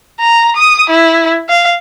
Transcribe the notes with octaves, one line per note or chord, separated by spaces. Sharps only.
A#5
D#6
E4
F5